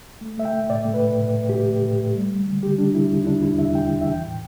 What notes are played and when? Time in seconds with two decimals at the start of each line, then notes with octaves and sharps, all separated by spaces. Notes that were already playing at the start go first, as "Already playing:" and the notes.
0.21 A3
0.37 A3 E5
0.45 G5
0.53 A3
0.70 A2 D5
0.85 A3
0.94 B4
1.02 A2
1.18 A2
1.33 A3
1.49 A2 G4
1.66 A3
1.82 A2
1.99 A3
2.15 G3
2.31 G3
2.46 D3
2.63 D3 G4
2.78 G3 D4
2.94 D3 E4
3.11 E2
3.17 E4
3.27 D3 D4
3.42 E2 E4
3.58 E2 E5
3.75 D3 G5
3.91 E2
4.01 E5
4.07 E3 G5
4.23 A2